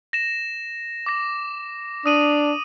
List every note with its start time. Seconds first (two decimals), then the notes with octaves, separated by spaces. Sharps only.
0.13 A#6 E7
1.06 D6 A#6
2.06 D4 D#6 D#7 F#7